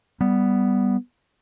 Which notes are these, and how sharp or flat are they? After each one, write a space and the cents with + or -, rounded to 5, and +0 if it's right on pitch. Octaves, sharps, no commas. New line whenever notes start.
G3 +0 B3 +0